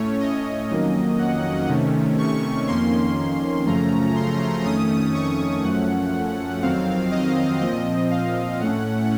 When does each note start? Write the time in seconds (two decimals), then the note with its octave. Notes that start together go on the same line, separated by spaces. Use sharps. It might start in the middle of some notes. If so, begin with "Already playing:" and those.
Already playing: A2 A3 C#4 C#5
0.21 D#5
0.70 F2 D#3 F#3 A#3 C#4
1.19 F#5
1.68 C3 D#3 A3 C#4
2.19 C#6
2.67 F2 D#3 A#3 C#4 C6
3.66 F#2 C#3 F3 A3 C#4 A#5
4.15 C6
4.64 F2 D#3 A3 C#4 D#6
5.14 C#6
5.63 F#2 F3 A3 C#4 F#5
6.62 F2 D#3 F#3 C4 F5
7.11 D#5
7.61 A#2 F3 C4 D#5
8.11 F5
8.60 A2 A3 C#4 F#5